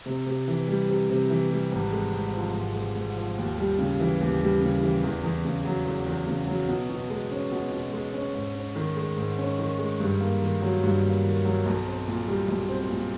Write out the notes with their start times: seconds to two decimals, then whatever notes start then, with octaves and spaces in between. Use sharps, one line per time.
0.06 C3
0.26 C3
0.48 E3
0.68 G3
0.89 C3
1.10 C3
1.30 E3
1.51 G3
1.71 G#1
1.92 G#3
2.13 G#2
2.34 F3
2.55 G#1
2.74 G#3
2.95 G#2
3.16 F3
3.38 D#2
3.58 G3
3.79 C#3
4.00 E3
4.21 D#2
4.41 G3
4.62 C#3
4.82 E3
5.03 E2
5.23 E2
5.45 C#3
5.65 F#3
5.86 E2
6.06 E2
6.27 C#3
6.47 F#3
6.68 B2
6.90 B2
7.10 G#3
7.31 C#4
7.52 B2
7.72 B2
7.93 G#3
8.13 C#4
8.35 G#2
8.55 C#4
8.76 D#3
8.96 G#3
9.17 G#2
9.38 C#4
9.59 D#3
9.79 G#3
10.00 G2
10.21 A#3
10.42 D#3
10.62 F#3
10.83 G2
11.04 A#3
11.25 D#3
11.45 F#3
11.66 B1
11.86 C4
12.07 A#2
12.27 G3
12.48 B1
12.69 C4
12.90 A#2